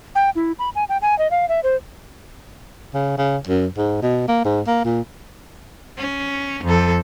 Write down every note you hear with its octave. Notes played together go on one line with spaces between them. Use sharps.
G5
E4
B5
G#5
G5
G#5
D#5
F5
E5
C5
C#3
C#3
F#2
G#2
B2
A#3
G#2
A#3
A#2
C#4
F2 A4